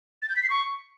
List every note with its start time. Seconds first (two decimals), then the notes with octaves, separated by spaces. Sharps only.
0.22 A6
0.29 G6
0.36 B6
0.43 C7
0.50 C#6